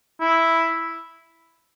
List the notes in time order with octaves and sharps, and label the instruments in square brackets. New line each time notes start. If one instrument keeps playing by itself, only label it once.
[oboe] E4